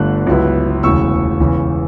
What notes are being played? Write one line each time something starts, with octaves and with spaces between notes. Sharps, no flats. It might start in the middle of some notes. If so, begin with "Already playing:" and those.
Already playing: G1 G2 D3 A3 D4 F#6
C#2 C#3 F#3 B3 E4
E1 D2 C#3 E3 C#6 E6
E1 E2 C#3 E3